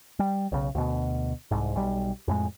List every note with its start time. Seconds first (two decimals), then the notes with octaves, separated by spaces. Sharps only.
0.19 G3
0.52 B1 C#3
0.75 D2 B2
1.51 C2 G#2
1.75 B1 G3
2.28 F2 A2 G#3